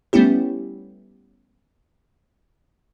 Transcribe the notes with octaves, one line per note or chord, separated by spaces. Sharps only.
G3 A3 B3 C#4 E4 G4